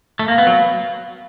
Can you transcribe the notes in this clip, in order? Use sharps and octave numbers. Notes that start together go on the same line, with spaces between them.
A3
A#3 F5
B3
F#3